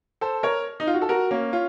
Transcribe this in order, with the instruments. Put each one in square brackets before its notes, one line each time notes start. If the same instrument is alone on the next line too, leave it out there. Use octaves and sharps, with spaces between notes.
[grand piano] A4 C5
A#4 C#5
D#4
F4
F#4
A4
F#4 A#4
A#3 C#4
C#4 F4